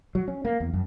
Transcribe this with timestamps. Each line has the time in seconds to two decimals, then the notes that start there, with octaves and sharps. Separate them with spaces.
0.15 F#3
0.28 C#4
0.45 A#3
0.60 E2
0.74 F#2